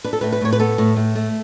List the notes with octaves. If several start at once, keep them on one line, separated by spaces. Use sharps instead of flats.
D4 B4
A4
A2 B4
B4
A2 C#5
B4
B3 A4
A2
A2
A3